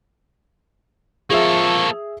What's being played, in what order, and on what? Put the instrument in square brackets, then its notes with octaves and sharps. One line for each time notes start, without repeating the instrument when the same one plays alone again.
[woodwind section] F3 [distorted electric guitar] A#3 A4 [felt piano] G#4 E5 [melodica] C#6